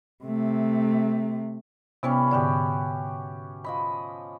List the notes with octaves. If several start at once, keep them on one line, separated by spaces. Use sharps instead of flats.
C3 A3
C3 E3 G3 B3 C#4
G#2 D3 B3 F#4 G4 D5
F3 D#5 B5